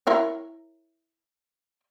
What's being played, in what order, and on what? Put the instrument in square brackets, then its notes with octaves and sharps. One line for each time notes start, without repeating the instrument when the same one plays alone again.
[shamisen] E4 A#4 C#5